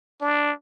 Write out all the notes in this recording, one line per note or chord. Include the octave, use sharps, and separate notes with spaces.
D4